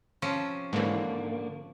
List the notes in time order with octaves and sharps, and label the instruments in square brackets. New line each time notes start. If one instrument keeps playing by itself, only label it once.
[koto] C3 F3 C#4
[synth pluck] G#2 E3 [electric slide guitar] D3 A#3 D4